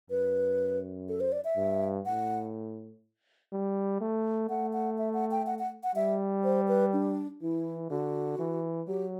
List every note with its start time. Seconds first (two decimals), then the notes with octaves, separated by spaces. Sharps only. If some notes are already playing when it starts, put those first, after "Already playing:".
0.10 F#2 B4
1.09 A4
1.20 C5
1.32 D5
1.44 E5
1.56 G2
2.05 A2 F#5
3.52 G3
4.01 A3
4.50 A3 F#5
4.73 F#5
4.98 E5
5.14 F#5
5.31 G5
5.47 F#5
5.59 F#5
5.83 F#5
5.95 G3 E5
6.44 C5
6.68 B4
6.93 D4
7.42 E3 E4
7.90 D3 F#4
8.39 E3
8.88 F#3 G4